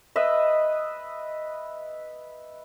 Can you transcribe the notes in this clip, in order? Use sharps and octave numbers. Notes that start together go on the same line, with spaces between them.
B4 D#5 E5